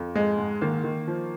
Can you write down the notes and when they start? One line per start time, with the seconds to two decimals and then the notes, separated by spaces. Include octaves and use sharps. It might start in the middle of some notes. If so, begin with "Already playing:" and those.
Already playing: F2
0.15 G#2 G#3
0.38 G#2
0.61 D#3 A#3
0.84 D#3
1.07 F3